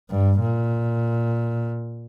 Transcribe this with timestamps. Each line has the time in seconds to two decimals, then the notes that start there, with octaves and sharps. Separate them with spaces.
0.11 G2
0.40 A#2